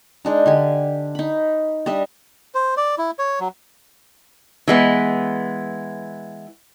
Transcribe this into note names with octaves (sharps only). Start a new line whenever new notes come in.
G#3 D4 D#4
D3 G4 G#5
D#4 B5
G3 D4 D#5 E5
C5
D5
E4
C#5
F#3
E3 G#3 B3